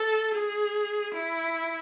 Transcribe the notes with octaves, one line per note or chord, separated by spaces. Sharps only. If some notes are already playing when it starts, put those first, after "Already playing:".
Already playing: A4
G#4
E4